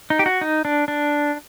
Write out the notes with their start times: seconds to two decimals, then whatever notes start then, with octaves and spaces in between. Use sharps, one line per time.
0.10 D#4
0.19 G4
0.26 F#4
0.41 D#4
0.65 D4
0.88 D4